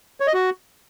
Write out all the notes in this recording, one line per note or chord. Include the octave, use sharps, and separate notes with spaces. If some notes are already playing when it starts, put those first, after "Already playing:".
C#5
D#5
F#4